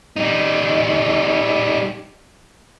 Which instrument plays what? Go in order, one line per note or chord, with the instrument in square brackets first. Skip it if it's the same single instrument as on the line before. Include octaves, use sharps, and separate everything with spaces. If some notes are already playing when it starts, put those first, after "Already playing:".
[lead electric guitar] G3 D#4